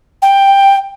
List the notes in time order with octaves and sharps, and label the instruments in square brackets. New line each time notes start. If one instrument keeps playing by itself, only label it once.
[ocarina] G5